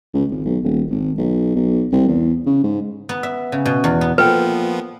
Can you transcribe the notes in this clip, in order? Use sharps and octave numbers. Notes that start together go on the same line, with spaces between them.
C#2
G#1
B1
D#1
G#1
B1
B1
C2
E2
C#3
G#2
B3
E5
C#3
B2
E2
B3
A#2 F3 B3 A4 B4 G5